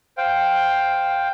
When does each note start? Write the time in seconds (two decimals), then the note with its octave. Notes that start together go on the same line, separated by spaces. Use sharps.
0.18 C5 F5 G5